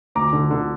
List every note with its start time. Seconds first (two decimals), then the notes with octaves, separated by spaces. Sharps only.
0.15 D2 A#5 D6
0.33 D3
0.51 D3